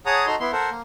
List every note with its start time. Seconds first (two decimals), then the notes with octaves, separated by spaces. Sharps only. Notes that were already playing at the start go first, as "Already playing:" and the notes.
0.06 G#4 C#5 F#5 A5 A#5 D#6
0.27 D#4 F#4 A4 A#5 C6
0.40 B3 E4 C6
0.52 A4 A#4 C5 F#5
0.71 A#3